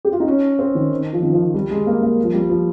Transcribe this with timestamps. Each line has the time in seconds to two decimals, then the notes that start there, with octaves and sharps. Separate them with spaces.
0.05 G4
0.12 F4
0.20 D#4
0.27 C#4
0.59 C4
0.75 D#3
1.13 F3
1.23 D#3
1.33 F3
1.44 F3
1.54 G3
1.71 G#3
1.87 A#3
2.02 A#3
2.23 F3
2.34 G3
2.50 F3